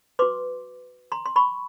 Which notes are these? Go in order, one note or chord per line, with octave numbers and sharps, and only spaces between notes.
F#4 B4 C6 D6
A#5 C6
C6
B5 C#6